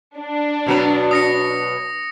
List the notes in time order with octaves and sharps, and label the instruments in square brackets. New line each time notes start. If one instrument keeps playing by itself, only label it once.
[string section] D4
[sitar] B2 F#3 B4
[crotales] D#6 A#6 C#7